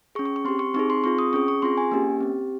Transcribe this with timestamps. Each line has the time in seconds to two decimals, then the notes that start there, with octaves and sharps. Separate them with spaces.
0.15 G#4 C#6
0.19 C#4
0.25 C#6
0.36 C#6
0.45 C4 G4 C6
0.59 C#6
0.74 C4 D#4 G#4 C#6
0.90 C6
1.04 C4 F4 G#4 C#6
1.19 D#6
1.33 C#4 G#4 C#6
1.48 C#6
1.62 C4 F4 G#4 C6
1.77 G#5
1.92 A#3 C#4 G4
2.21 C4 G4